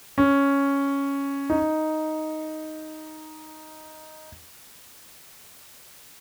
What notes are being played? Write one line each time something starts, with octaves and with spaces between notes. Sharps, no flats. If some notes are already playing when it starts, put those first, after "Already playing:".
C#4
D#4